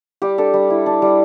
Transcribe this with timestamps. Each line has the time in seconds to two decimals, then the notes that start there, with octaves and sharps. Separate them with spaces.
0.22 G3 G4
0.38 D4 A4
0.54 G3
0.70 E4
0.86 D4
1.02 G3